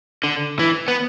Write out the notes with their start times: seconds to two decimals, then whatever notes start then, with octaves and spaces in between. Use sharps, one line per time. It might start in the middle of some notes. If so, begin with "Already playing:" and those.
0.24 D3
0.59 E3
0.88 B3